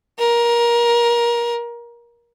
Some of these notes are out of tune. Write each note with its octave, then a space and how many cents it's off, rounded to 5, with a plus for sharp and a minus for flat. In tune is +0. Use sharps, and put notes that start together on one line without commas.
A#4 +20